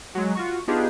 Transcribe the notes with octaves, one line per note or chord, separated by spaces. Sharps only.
F#3 G#3
F4 F#4 C#6
B3 D4 D#4 F4 G4 G#4